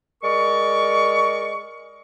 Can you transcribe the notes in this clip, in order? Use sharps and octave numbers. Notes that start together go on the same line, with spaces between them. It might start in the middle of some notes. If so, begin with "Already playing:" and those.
G#3 A#4 D5 C#6